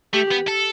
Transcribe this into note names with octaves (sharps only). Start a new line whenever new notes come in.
A3 G4
B3
A4